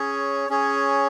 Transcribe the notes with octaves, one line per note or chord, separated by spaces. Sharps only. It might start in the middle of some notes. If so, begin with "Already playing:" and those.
Already playing: C#4 G#4 C#5
C#4 G#4 C#5